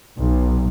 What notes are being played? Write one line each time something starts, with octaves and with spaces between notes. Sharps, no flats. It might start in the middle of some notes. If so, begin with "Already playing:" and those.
B1